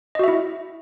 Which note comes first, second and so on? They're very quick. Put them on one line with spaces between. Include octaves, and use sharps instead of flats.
D#5 F#4 E5 E4